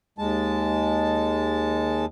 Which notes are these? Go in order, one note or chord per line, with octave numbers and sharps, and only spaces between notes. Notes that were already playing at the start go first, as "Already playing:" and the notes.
D#2 G#3 A5